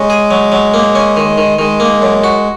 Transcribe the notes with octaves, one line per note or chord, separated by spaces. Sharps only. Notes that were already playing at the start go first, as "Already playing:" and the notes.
Already playing: G#3 C#4
G#4
F#3
F#3
A#3
C#4
D#3
D#3
D#3 G#3
A#3
F#2
F#4